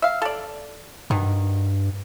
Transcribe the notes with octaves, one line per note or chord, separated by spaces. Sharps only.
E5 F5
A4 D5
G2 B2 D#3